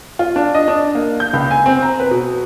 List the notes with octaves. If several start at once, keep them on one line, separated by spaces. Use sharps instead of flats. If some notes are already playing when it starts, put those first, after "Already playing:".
F4
D4
D#5
D4
A#3
G6
C#2
G#5
C4
A#5
B4
B2